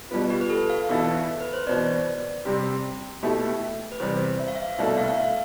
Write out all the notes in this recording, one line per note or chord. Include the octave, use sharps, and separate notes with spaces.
B2 G3 B3 F4
G4
B4
A4
F5
E2 B2 B3 E4 A4
B4
C5
E2 B2 B3 D5
C3 G3 C4 G4
B2 A3 E4 G4
B4
E2 C3 G3 C5
E5
F5
E5
C2 B2 A3 D4 A4 E5
F5
F5
E5